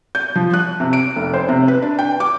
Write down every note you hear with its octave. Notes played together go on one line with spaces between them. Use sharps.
G6
F3
F#6
C3
D7
F1
C5
C3
B4
D4
G5
D6